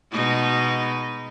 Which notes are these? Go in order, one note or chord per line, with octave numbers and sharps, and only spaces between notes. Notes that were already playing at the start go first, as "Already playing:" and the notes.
B2 G#3 D#4